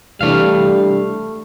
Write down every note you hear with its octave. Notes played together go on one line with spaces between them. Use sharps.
C3 E3 G3 A3 D4 F5